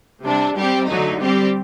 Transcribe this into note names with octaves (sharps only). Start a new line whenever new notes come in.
C3 G3 D4
G3 C4 G4
D3 F#3 A3 D#4
G3 C4 G4